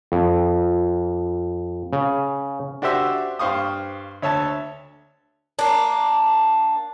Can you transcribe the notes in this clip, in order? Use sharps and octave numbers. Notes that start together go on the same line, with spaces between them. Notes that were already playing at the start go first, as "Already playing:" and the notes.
F2
C#3
D4 F#4 G4 C5 E5
G2 C5 F5 C#6 D#6
D2 C#5 E5 A5
A#3 D4